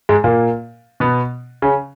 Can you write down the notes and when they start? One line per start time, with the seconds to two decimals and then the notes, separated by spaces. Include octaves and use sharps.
0.09 G#2 G#3
0.24 A#2 A#3
1.00 B2 B3
1.62 C#3 C#4